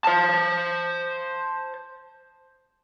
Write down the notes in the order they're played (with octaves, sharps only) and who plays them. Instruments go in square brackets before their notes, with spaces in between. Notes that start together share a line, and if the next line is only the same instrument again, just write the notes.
[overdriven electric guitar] C5 A5